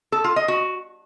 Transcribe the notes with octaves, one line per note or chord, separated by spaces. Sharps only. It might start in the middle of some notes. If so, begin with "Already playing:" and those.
A4
F4
D#5
F#4